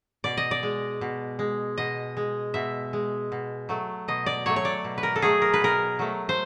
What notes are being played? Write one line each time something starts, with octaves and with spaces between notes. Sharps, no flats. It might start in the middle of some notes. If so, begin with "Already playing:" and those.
B2 D5
D#5
D5
G#3
B2
G#3
B2 D#5
G#3
B2 E5
G#3
B2
F#3 A3
B2 D#5
D5
F#3 A3 C#5
C#5
D5
B2
B4
A#4
A4
F#3 A3 G#4
A#4
B4
B2 A#4
F#3 A3
C5